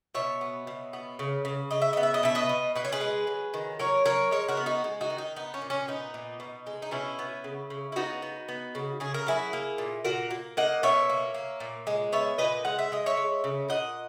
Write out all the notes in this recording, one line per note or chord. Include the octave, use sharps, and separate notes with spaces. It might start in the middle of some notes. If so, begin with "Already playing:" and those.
B2 C#5 E5
B3
B2
B3
C#3
C#3
C#3 D#5
E5
B3 D#5
E5
D#5
B2 E5
B4 D#5
B2
B2 B4
C#5
G#4 B4
G#3
F#3
D#3
F#3 A#4 C#5
F#3 A#4 C#5
G#3 A#4 C#5
F#4 A#4
B3
D#4 F#4
G#3
D#4 F#4
D#3
D#4
B3 D#4
C#4
A#2
C#4
B3 D#4
A#2
B2
G#3
D#4
B2 C#4 E4
B3
C#3
C#3
E4
B3 D#4 F#4
B3
B3
C#3
C#3 G#4
A#4
F#3 E4 G#4
A#3
A#2
A#2 F#4 A#4
A#3
A#3 D#5 F#5
B2 C#5 E5
A#3
A#3
A#2
G#3
B3 C#5 E5
A#2 B4 D#5
G#3 F#5
E5
G#3 D#5
C#5 E5
G#3
C#3
A#2 D#5 F#5